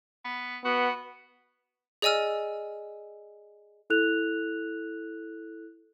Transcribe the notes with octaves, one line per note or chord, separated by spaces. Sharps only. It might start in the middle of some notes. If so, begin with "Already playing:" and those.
B3
B3 F#4
G#4 D5 D#5 G#5 E6 F6
E4 A4 F#6 F7